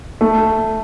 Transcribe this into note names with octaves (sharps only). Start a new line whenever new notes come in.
A3